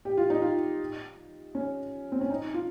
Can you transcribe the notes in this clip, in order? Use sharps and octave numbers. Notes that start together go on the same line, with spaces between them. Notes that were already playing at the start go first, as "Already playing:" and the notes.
G4
F4
D#4
F4
C#4
C4
C#4
D#4
F4